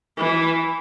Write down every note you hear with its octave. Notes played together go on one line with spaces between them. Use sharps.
E3